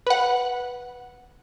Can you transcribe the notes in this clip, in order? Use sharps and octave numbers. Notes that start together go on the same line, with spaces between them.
B4 F#5